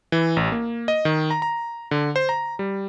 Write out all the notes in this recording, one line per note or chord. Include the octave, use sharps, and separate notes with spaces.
E3
A1
A#3
D#5
D#3
A#5
A#5
D3
C5
A#5
G3